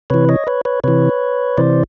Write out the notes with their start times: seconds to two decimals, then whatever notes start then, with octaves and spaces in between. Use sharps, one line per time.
0.10 C3 E3 B4 C#5
0.29 C#5 D#5
0.47 B4 C#5
0.65 B4 C#5
0.84 C3 E3 B4 C#5
1.57 C3 E3 C5 D5